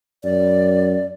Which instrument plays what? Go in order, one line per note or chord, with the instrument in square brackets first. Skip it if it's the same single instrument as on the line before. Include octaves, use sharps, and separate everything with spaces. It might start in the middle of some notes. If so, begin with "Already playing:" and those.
[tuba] F#2 [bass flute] D5